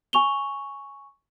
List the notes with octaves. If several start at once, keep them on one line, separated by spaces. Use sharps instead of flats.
G#5 C#6 F7 G7